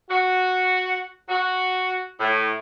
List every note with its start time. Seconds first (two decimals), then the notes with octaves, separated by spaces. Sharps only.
0.10 F#4
1.29 F#4
2.20 A2